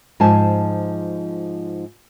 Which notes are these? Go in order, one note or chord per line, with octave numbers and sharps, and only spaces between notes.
G#2 F3 G#5 A5